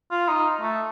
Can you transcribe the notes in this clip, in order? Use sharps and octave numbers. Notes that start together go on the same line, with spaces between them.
F4
D#4
A3